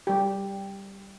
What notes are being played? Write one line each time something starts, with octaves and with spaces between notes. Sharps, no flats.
G3 G4